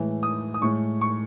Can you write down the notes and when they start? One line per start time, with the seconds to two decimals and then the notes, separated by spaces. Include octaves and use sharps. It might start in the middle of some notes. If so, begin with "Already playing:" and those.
Already playing: A2 E3 G#3
0.23 D#6
0.54 D#6
0.61 A2 G#3 C#6
1.01 C#6